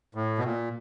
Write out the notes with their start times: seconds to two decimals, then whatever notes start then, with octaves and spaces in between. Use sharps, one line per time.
0.15 A2
0.38 B2
0.45 A#2